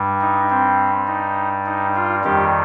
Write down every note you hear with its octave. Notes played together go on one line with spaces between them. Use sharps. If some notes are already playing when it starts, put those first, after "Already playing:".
Already playing: G2 G3
D#4
C4
D#4
D#4
F4
F2 D#3 G3 G4